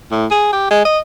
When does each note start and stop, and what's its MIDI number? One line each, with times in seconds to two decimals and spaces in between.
0.11 0.26 45
0.31 0.49 68
0.53 0.70 67
0.71 0.85 56
0.85 0.99 75